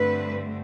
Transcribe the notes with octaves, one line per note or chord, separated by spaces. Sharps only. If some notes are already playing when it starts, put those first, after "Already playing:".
Already playing: G2 D3 A3 C4 B4